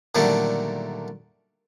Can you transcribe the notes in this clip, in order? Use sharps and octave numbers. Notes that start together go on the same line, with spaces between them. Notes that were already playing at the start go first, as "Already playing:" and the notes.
A#2 D3 D#3 F#3 G3 A3